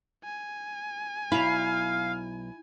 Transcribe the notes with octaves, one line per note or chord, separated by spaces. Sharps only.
G#5
B1 E4 F5 B5